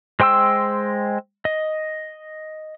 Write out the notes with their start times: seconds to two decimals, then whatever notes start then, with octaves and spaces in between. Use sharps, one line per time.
0.20 G#3 C5 G5 C6 E6
1.45 D#5